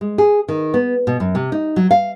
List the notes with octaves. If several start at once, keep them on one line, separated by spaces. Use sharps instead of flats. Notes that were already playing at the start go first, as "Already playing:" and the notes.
G#3
G#4
D#3
B3
B2
F#2
C3
D#4
F#3
F5